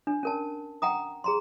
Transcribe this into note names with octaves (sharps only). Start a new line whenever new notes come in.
D4
C#4 A#4 A5
F#5 G5 A#5 D#6
G#4 A#5 C6